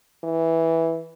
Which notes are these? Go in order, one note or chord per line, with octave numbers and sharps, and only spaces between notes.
E3